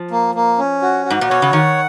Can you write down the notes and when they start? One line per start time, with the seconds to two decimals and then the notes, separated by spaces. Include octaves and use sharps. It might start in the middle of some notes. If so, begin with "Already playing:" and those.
Already playing: F3
0.11 A#3
0.35 A#3
0.58 C#4
0.82 F#4
1.06 G#2 F#4
1.21 A#2
1.29 B2 C#5
1.42 C#3
1.53 D#3 F#5